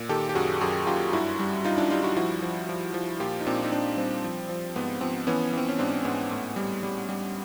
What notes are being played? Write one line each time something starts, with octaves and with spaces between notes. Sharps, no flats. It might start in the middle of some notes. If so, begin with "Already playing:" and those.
Already playing: A#2
D#3 G4 A4
G4
F#2 F#4 G#4
F#2 F#4 G#4
F#2 F4 G4
G2 E4 F#4
G3
G2 D#4 F4
D4 E4
G3 D#4 F4
E4 F#4
F3 E4 F#4
F3
F3
F3
A#2 F4 G4
D#4
A#2 C4 D4
D#4
A#2 C4 D4
G3 C4
F3
F3
G#2 B3
F3 C4
E3 B3 C#4
E3 C4
C#4
G#2 C4 D4
G#2 B3 C#4
A2
G3
G3
G3